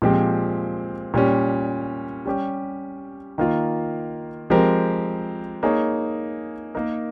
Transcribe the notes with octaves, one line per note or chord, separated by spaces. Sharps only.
A#2 F3 G#3 C4 G4
A#2 G3 C#4
G3 C#4 G4
D#3 A#3 F4
F3 G#3 C4 G4 A#4
A#3 D#4 G#4 C#5
A#3 D#4 A#4